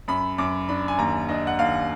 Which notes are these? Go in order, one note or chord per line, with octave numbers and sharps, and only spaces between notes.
F#2 B5
F#2 D6
D4 B5
G#5
D#2 A#5
D4 D#5
F#5
D#2 F5